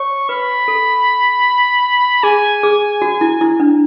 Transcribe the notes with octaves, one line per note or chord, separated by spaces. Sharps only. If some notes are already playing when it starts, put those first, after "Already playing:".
Already playing: C#5 C#6
B4 B5
A4
G#4 G#5
G#4
F#4
E4
E4
D4